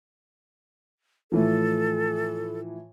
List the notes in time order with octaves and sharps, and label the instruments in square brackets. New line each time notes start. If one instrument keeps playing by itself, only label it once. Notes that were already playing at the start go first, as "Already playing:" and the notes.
[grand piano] A2 E3 F3 [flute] A4